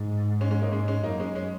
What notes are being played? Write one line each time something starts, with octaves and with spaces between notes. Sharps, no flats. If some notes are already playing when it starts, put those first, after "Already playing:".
Already playing: G#2
G#3 C#4
G#3 C#4
A#3 D#4
G#2 G#3 C#4
G#3 C#4
F#2 A#3 D#4
G#3 C#4
G#3 C#4